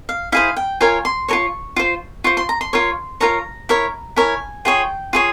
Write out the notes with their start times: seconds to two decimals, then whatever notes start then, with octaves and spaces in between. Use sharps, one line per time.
0.09 F5
0.32 E4 G#4 C5 F5
0.56 G5
0.81 F4 A#4 C#5 G#5
1.05 C6
1.28 F4 A#4 C#5 C#6
1.76 F4 C5
2.24 F4 C5 C#6
2.37 C6
2.49 A#5
2.61 C6
2.73 F4 A#4 C#5
3.20 F4 A#4 C#5 A#5
3.69 E4 A#4 C#5
4.16 E4 A#4 C#5 G#5
4.65 F4 G#4 C#5 G5
5.13 F4 G#4 C#5